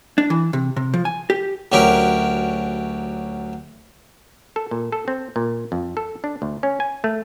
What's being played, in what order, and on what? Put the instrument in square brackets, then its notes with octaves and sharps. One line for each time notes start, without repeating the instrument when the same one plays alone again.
[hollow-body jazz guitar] D4
E3
C3
C3
F3
G#5
G4
[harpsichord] D2 F#3 C#4 G4 A#4
[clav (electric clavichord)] A4
A#2
A4
C4
A#2
F2
A4
D4
D2
C#4
G#5
A3